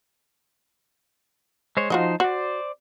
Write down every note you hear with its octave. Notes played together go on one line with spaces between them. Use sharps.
G#3 C5 C#5
F3 D#4 F4 F#4 C5 D#5
F#4 C5 D5